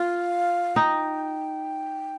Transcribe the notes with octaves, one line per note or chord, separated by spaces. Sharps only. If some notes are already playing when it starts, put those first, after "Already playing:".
Already playing: F4 F5
D#4 G5